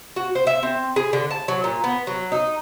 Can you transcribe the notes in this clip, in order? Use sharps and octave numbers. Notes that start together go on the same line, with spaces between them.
F#4
C5
E5
C4
G#4
D3
A5
F#3
A#2
B3
F#3
D#4